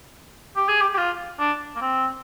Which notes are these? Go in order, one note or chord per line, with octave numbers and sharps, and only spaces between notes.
G4
G#4
G4
G4
F4
D4
A#3
C4